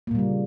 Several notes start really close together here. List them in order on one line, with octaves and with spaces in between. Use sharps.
A#3 A#2 G3 C#3